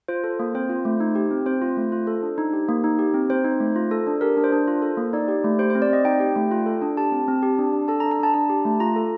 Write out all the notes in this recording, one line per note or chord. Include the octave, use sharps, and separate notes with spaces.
F4 C5
A4
A#3
C4 C5
F4
A3
D#4
G4
C4
C4 C5
F4
A3
F4
A4
D4
D#4
G4
A#3
D#4
G4
C4
C4 C5
D#4
A3
F4
A4
D4
G4 A#4
D4
C5
D4
F4
A4
A#3
D#4 D5
G4
A3
G4 C5
C5
C4
D5
C4 D#5
D#4 G5
G4
A3
F4
A4
D4
G4 A5
C4
C4
G4
D4
D4
A4 A5
A#5
D4
A#5
D4 A5
D4 A5
G4
A3
F4 A#5
A4